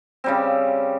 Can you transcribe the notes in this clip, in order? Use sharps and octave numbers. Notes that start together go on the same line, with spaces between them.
C#3 G3 C4